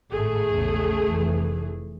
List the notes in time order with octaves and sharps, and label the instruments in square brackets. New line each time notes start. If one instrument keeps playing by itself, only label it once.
[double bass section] G#1 A2 [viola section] A3 G#4
[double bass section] A#1 E2 C#3
F1 F2 E3